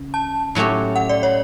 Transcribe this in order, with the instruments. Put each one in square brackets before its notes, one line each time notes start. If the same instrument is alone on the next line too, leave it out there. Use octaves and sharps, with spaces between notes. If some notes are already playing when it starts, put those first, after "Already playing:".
Already playing: [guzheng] C#3
[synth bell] A5
[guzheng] A2 F#3 A3 C#4 G4
[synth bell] F#5
D5
C#5